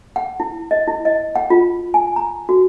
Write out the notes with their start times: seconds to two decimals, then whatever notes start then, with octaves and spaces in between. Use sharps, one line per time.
0.16 F#5
0.40 E4
0.71 D#5
0.88 E4
1.05 D#5
1.36 F#5
1.50 F4
1.94 G#5
2.16 A#5
2.49 F#4